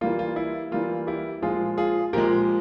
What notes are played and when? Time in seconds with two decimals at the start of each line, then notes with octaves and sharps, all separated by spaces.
0.01 E3 G3 A#3 F4
0.19 F4
0.36 E4
0.72 E3 G3 A#3 F4
1.07 E4 G4
1.42 A#2 F3 G#3 F4 G#4
1.78 F4 G#4
2.13 A#2 F3 G#3 G4 A#4